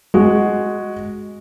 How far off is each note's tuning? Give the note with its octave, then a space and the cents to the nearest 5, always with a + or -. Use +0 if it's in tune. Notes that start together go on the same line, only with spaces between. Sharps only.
G#3 +0 F#4 +0